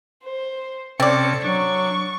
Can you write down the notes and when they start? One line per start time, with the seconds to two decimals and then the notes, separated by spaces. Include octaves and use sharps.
0.22 C5
1.00 C3 C4 C#4 A4 D5 C#7
1.45 F#3 D4 C#6